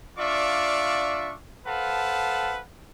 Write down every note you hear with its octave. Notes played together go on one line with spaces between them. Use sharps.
D4 F4 D5 E5 F5 C#6
A4 B4 C5 F5 F#5 A5